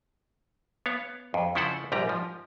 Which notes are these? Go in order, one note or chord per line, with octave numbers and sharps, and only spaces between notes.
B3 C#5 F5
F2
C#3 F3 E4 A4 C5 F#5
A#1 G#2 G3 G4 A#5
F3